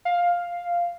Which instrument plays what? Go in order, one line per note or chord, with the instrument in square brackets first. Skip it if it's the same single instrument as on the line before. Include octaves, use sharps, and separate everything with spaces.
[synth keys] F5